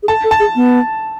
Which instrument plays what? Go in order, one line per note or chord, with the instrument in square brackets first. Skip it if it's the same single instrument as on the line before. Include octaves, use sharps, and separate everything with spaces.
[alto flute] G#4
[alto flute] A4 [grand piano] A5
[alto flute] A4
[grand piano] A5
[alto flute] G#4
B3